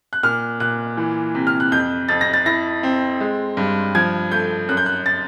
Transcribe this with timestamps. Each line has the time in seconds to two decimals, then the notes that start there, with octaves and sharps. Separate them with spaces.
0.13 F#6
0.23 A#2 F6
0.60 A#2 F#6
0.97 E3
1.35 C3
1.47 F6
1.60 F#6
1.72 F2 G6
2.09 F2 A6
2.21 A#6
2.34 A6
2.46 E4 A#6
2.83 C4
3.21 G#3
3.57 G2
3.95 F3 G#6
4.32 A3 G6
4.69 F#2 F#6
4.77 G6
4.86 F#6
5.06 A6